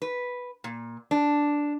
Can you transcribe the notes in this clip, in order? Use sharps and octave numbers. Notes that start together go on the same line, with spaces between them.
B4
A#2
D4